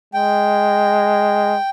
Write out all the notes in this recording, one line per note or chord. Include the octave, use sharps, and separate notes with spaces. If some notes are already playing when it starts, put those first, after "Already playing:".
G#3 G5